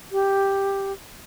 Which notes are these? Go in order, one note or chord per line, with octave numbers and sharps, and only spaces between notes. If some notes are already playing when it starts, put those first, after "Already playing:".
G4